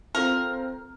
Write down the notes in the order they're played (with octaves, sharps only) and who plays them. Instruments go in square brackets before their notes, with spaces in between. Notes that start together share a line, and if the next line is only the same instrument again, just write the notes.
[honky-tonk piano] C4 F4 A4 [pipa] A#4